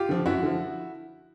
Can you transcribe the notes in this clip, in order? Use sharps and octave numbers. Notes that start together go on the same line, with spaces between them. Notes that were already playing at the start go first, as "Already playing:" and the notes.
Already playing: F4 G4
D3 F3
F#2 E4 F#4
D3 F3